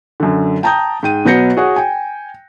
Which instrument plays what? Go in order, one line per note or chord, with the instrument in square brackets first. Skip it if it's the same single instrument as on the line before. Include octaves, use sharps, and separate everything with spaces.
[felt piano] F#2 D3
G5 A5 A#5 D#6 G6
G#2 G5 D#7
B2 F#3 B3 G6 A#6 C#7
F#4 G#4 C#5 F#5
G5 G#5